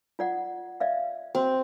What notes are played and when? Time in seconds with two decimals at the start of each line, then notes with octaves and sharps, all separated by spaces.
0.19 F4 D5 F#5
0.80 D5 E5 F5
1.35 C4 F#4